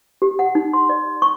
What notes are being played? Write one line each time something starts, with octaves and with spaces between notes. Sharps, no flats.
G4
F#5
D#4
C6
D5
C#6